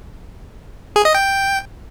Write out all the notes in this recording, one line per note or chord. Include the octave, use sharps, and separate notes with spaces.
G#4
D#5
G5